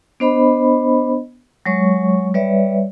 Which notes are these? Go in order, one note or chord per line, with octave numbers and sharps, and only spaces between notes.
B3 D4 C5 D#5 B5
F#3 G#3 C#5 C#6
G3 B4 C#5 D5 E5